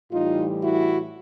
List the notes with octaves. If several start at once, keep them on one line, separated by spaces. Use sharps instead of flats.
A2 E3 G3 D#4 F4
E4 F#4